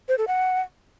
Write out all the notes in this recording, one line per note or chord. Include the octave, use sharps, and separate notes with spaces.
C5
A4
F#5